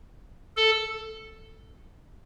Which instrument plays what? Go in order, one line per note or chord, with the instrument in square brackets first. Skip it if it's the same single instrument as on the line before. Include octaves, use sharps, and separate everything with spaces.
[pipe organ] A4